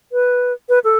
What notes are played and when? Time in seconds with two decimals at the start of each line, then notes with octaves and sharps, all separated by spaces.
0.12 B4
0.69 B4
0.84 A4